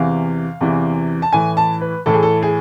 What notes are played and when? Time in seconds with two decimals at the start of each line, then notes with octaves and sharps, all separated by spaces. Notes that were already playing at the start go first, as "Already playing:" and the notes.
Already playing: E2 C3 E3 F5
0.61 E2 C3 E3
1.22 A5
1.33 A2 E3 G#5
1.57 A5
1.81 B4
2.06 A2 E3 A4
2.14 G#4
2.23 A4
2.42 G#4